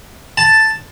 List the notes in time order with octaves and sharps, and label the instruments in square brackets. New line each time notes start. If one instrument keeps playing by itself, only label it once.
[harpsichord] A5